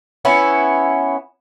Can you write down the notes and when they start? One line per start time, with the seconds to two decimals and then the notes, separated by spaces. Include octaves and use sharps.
0.25 B3 C#4 E4